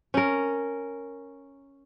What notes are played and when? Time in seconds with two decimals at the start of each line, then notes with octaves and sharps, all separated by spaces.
0.14 C#4 A#4